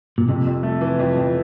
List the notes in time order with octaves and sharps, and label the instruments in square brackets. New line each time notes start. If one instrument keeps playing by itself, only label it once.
[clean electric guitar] A#2
[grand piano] F2 [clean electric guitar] C3
[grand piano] F2
A3
E3
F2
F2